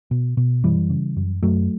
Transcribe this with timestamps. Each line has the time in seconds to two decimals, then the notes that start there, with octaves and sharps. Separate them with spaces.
0.11 B2
0.37 B2
0.63 F#2 E3 G3
0.90 C#3
1.17 F#2
1.42 F#2 F#3 A3